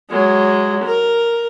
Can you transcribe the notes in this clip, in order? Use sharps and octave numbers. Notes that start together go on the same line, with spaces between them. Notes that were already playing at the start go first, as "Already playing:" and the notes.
F#3 G#3
A#4